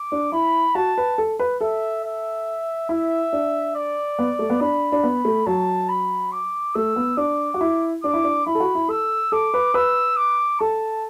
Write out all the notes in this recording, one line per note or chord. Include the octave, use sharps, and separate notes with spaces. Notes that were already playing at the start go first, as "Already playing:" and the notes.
Already playing: D6
D4
E4 B5
F#4 A5
B4
A4
B4
A4 E5
E5
E4 E5
D4
D5
B3
A3
B3
D4 B5
D4
B3
A3
F#3 A5
B5
D6
A3 E6
B3
D4 D6
F#4
E4
D4 D6
E4
D4
E4 B5
A4
F#4
E4
A4 E6
A4 D6
B4
B4 E6
D6
A4 A5